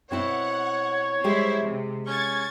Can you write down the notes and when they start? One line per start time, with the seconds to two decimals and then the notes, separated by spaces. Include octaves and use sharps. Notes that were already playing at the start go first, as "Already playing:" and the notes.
0.11 B2 C4 E4 C#5 F#5
1.24 G3 G#3 E4 G4 C5
1.62 C3
2.07 C#4 C#6 G#6 A6